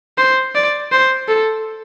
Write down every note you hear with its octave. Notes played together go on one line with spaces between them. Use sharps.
C5
D5
C5
A4